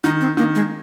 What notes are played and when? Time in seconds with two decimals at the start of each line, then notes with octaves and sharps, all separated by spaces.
0.04 D#3 D#4
0.21 C4
0.37 D#3 A#3
0.55 G#3